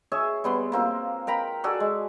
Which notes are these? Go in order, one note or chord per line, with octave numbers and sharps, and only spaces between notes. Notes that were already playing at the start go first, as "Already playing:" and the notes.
G#4 C#5 E5
G3 B3 C6
A#3 C4 F4
A#4 G5 A#5 B5
F#4 G#4 A4 D5
G#3